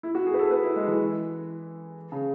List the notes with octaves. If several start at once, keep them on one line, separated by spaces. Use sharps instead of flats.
E4
F#4
G#4
B4
A4
B4
E4
G#3
E3
C#3